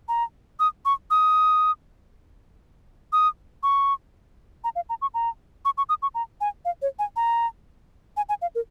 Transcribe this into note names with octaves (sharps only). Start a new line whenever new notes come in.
A#5
D#6
C#6
D#6
D#6
C#6
A#5
F5
A#5
C#6
A#5
C#6
C#6
D#6
C#6
A#5
G#5
F5
C#5
G#5
A#5
G#5
G#5
F5
A#4